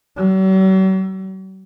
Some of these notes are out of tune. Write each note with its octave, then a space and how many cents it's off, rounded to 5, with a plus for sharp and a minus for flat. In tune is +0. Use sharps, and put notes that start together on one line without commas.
F#3 +45